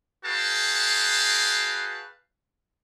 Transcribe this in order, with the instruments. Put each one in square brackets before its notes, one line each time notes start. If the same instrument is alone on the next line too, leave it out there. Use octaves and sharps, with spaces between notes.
[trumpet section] F#4 G#4 B4 F5 G5 A5